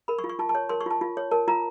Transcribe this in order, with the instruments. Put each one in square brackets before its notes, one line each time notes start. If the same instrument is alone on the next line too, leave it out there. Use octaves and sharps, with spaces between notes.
[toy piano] A#4 B5
C#6
F4
C#6
F4 A5
A5
C#5
A#4 C6
C#6
F4 A5
F4
C#5
A#4 A5
F4 A#5